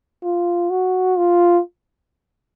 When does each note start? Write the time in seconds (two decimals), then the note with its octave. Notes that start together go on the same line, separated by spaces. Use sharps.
0.23 F4
0.70 F#4
1.18 F4